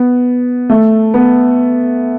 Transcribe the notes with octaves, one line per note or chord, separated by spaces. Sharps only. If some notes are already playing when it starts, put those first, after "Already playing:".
Already playing: B3
A3
B3